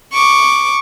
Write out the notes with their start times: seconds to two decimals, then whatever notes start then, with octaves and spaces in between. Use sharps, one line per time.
0.14 C#6 D6